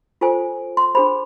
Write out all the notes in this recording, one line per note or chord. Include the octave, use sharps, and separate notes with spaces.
F4 A4 C5 G#5
C6
D4 G#4 C5 B5